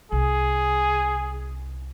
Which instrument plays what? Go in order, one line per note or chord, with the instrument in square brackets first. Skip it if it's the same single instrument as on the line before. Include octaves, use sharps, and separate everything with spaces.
[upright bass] C2 [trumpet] G#4